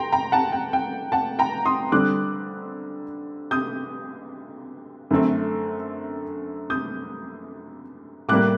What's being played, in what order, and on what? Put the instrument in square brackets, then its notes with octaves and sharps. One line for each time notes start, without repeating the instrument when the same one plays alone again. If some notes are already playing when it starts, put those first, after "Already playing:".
Already playing: [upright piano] G5 A#5 C6
G5 A#5
F#5 A5
G5
G5
F#5 A5
G5 A#5
C6 D#6
D3 G3 C4 D6 F#6
D#6 G6
F#2 D3 A3 C4
D#6 G6
A2 G3 A#3 D6 F#6